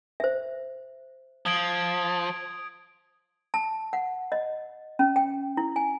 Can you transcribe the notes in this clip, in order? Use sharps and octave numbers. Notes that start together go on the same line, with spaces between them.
C5 E5
F3 D#6 G#6 D7
A5
F#5
D#5
C#4
G5
E4
G#5